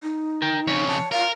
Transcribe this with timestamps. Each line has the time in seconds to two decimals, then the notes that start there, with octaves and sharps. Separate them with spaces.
0.03 D#4
0.42 A#4 G5
0.67 F2 C#3 C#5
0.88 A5
1.12 A#4 F5